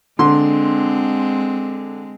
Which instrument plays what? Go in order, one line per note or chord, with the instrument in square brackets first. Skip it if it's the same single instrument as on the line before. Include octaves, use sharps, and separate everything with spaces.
[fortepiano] D3 C6 [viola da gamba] G#3 C4